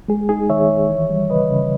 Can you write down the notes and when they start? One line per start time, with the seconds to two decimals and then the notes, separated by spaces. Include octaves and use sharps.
0.08 G#3 G#4
0.29 D#4 G#4
0.50 D#3 C#5 E5
0.69 D#3
0.90 E3
1.10 G3
1.30 C#3 B4 D#5
1.50 C#3